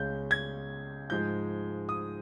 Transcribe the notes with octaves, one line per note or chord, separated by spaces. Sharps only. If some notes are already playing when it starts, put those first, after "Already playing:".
Already playing: C#2 C#3 G#3 C#4 G6
G#6
G#2 F3 G#3 G6
D#6